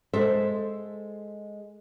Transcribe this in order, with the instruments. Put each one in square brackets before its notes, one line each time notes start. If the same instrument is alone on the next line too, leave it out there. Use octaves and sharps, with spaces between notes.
[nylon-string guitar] G#3 A4 C5 E5